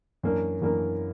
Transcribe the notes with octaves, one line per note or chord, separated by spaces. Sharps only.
F#2 E3 A#3 D4 A#4
F#2 E3 A#3 D4 A#4